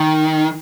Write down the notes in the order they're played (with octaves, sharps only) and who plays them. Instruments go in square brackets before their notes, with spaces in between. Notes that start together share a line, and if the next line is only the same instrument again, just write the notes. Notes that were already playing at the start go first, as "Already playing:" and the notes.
Already playing: [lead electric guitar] D#3